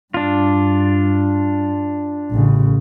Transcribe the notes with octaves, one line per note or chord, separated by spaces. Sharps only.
G2 D4 F4
A1 C#3